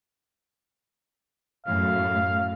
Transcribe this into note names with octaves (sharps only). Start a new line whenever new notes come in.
F#2 A2 F5